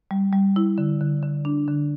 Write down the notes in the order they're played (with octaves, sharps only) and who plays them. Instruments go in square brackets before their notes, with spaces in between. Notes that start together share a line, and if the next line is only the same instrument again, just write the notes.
[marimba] G3
G3
E4
D3
D3
D3
D4
D3